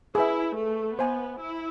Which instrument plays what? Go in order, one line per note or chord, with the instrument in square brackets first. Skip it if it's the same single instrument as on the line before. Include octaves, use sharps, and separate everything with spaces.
[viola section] E4 [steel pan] G#4 B4 E5
[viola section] A3
[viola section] B3 [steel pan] C5 E5 G#5
[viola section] E4